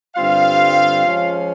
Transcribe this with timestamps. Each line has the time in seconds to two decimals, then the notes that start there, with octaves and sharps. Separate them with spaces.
0.17 G2 D3 G3 C4 F4 F5
1.03 F3 G#3 C#4